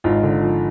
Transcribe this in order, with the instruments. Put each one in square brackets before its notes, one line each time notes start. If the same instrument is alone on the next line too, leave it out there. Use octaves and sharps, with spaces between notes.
[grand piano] G#1 D#4 F4
D3
F3